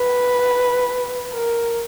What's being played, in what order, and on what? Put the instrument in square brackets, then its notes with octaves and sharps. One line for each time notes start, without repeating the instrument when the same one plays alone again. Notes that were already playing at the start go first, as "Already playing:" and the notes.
Already playing: [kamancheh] B4
A#4